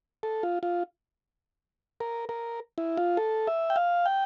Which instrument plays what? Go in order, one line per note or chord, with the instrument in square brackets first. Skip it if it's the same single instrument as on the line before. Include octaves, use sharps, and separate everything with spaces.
[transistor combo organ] A4
F4
F4
A#4
A#4
E4
F4
A4
E5
G5
F5
G5